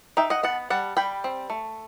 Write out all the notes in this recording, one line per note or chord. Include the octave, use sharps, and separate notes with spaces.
D#4 E5 G5
D#5 F#5
B3 F#5 A5
G3 F#5 A5
G3 G5 B5
C4
A3